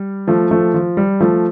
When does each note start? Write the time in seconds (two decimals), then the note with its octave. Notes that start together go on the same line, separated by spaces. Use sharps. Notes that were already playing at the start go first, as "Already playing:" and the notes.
Already playing: G3
0.28 F3 A3
0.51 F3 A3
0.74 F3
0.97 G3
1.20 F3 A3